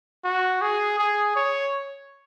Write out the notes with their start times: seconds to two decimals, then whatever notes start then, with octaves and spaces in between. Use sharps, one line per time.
0.25 F#4
0.61 G#4
0.98 G#4
1.36 C#5